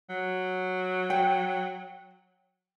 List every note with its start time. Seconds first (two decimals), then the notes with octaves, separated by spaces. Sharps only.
0.10 F#3
1.10 G5